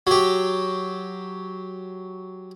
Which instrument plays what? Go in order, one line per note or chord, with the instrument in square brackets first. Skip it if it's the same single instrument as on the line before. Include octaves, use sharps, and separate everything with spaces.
[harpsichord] F#3 G4